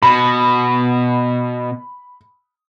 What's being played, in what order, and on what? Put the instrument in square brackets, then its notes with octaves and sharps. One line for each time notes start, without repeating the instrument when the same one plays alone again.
[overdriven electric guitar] B2 [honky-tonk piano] B5